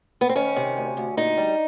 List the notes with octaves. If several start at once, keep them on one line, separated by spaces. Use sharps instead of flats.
B3
C4
D#3 C#4
C3
D2
D2
A#2 D#4
G3